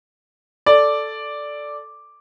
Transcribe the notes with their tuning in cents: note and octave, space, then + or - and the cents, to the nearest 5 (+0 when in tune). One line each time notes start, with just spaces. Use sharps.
A4 +0 D5 +0